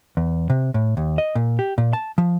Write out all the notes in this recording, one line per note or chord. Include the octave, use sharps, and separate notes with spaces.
E2
C3
A2
D#2
D#5
A#2
G4
A#2
A5
F3